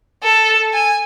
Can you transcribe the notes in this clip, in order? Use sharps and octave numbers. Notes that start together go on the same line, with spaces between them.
A4
G#5